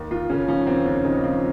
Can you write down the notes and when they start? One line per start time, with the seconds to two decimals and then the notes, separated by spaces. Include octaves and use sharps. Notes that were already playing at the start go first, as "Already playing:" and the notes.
Already playing: D#2
0.11 D#2 F4
0.30 C#3 C#4
0.48 F3 C#4
0.67 D#2 C4
0.86 D#2 C#4
1.04 C#3 D#4
1.23 F3 C4